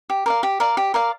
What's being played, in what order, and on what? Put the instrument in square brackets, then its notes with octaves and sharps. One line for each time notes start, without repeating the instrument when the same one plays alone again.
[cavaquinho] G4
A#4 D5 F5
G4
A#4 D5 F5
G4
A#4 D5 F5